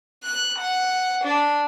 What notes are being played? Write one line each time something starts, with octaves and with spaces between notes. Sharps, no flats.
F#6
F#5
D4